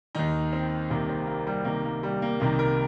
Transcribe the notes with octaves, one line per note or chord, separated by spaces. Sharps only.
D#2 D#3 D#4
C4
C2 C3 D#3 A#3
C4
A#3
G3
C2 C3 D#3 A#3
A#3
G3
A#3
C2 C3 D#3 A#3
A#4